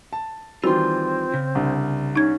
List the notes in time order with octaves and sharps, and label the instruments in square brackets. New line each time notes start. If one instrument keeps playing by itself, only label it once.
[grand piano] A5
[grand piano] D#3 E3 G3 [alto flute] C4 [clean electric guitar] F4 C6 [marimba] F#4
[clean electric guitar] C#3
[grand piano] C2 D3
[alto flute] C#4 [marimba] D#4 G#6